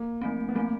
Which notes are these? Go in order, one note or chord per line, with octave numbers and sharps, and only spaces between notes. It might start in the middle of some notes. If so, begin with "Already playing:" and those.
Already playing: A#3
F3 A3 C4
B3
F3 A3 A#3 C4